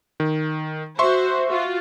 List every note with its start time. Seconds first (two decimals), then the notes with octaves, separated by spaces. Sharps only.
0.20 D#3
0.99 F#4 C5 E5 C6 C#6
1.47 F4 F#4